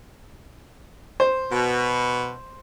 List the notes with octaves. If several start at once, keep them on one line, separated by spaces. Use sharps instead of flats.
C5
B2